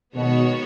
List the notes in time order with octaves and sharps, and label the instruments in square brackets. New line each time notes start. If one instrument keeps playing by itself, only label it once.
[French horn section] B2 [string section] D#3 G#3 B3 F#4 C#5